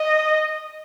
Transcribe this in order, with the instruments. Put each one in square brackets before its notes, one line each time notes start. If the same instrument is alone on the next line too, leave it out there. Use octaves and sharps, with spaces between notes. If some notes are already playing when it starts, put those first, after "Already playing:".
Already playing: [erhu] D#5